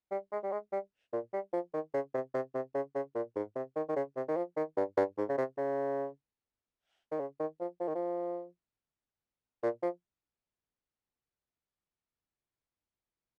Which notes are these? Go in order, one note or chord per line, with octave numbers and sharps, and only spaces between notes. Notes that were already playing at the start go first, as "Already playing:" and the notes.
G3
G#3
G3
G#3
G3
A#2
G3
F3
D#3
C#3
C3
C3
C3
C#3
C#3
A#2
G#2
C3
D#3
D#3
C#3
C3
D#3
F3
D#3
G2
G2
G#2
C#3
C3
C#3
D#3
C#3
D#3
F3
F3
D#3
F3
A#2
F3